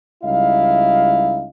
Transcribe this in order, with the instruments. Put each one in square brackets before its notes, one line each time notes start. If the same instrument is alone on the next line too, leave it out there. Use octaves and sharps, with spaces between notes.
[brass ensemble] C#2 G3 D#4 E4 D#5 F5